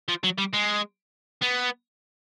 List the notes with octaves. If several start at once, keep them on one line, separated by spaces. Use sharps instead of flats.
F3
F#3
G3
G#3
B3